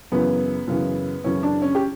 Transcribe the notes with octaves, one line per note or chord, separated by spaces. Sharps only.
F#2 C#3 E3 B3
F#2 C#3 E3
F#2 C#3 E3 C#4
D4
C#4
G4